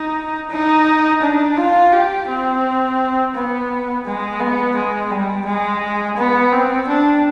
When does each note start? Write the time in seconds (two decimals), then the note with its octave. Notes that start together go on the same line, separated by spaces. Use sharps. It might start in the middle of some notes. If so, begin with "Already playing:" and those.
Already playing: D#4
0.50 D#4
1.22 D4
1.57 F4
1.92 G4
2.28 C4
3.34 B3
4.05 G#3
4.40 B3
4.75 G#3
5.10 G3
5.46 G#3
6.17 B3
6.52 C4
6.88 D4